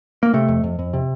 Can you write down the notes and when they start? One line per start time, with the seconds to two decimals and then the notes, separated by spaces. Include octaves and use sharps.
0.23 A#3
0.33 C3 A3
0.48 F2
0.64 F2
0.79 F2
0.93 C3